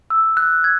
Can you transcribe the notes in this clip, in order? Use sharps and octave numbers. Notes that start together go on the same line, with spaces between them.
E6
F#6
G#6